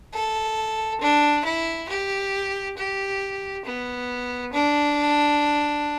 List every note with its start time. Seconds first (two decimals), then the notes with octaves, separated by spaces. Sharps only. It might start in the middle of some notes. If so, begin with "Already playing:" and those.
0.13 A4
1.01 D4
1.44 E4
1.88 G4
2.77 G4
3.65 B3
4.53 D4